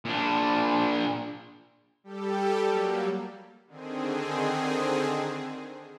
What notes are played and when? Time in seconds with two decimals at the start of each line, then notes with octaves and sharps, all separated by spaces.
0.05 A#2 D4
2.04 G3 G4 A4
2.66 F#3 G3 A#3
3.67 D3 D#3 C4 G#4